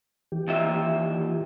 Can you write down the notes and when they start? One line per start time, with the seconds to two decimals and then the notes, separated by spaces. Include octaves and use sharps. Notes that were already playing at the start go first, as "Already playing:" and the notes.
0.32 E3 G4
0.48 D#2 A#2 E5